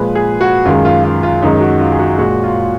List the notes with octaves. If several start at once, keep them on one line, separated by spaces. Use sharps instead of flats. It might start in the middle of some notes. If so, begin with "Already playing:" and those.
Already playing: A#2 F3 G#3 B4
G#4
F#4
F#2 D#3 G#3 F4
F4
F4
F4
F#2 D#3 G#3 D#4
F#4
F4
G#4
F#4
A#2 G#3 F#4
F4